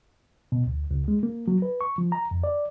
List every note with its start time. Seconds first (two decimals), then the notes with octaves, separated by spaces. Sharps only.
0.52 B2
0.66 D2
0.91 C#2
1.08 G#3
1.23 A#3
1.48 F#3
1.62 B4
1.81 C#6
1.98 F3
2.12 A#5
2.31 F2
2.44 D5